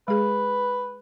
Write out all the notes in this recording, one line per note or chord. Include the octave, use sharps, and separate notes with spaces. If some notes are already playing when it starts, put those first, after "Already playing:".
G#3 G#4 B4